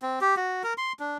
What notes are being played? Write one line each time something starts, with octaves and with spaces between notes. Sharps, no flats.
C4
G4
F#4
A#4
C6
D4